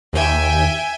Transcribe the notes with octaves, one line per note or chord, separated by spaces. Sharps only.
D#2 E5 G5 G#5